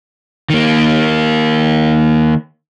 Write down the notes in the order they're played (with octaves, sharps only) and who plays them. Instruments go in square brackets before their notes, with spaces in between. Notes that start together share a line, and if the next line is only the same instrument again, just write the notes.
[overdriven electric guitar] D#3 A#3